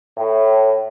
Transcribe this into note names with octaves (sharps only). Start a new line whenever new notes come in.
A2